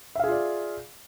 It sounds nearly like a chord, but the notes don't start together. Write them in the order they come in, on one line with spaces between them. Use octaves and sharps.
E5 F5 G#4 F4 D5